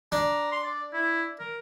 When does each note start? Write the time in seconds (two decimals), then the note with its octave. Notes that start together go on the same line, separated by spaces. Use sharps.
0.12 D4 A#5
0.52 C6
0.64 D5
0.93 E4
1.40 A#4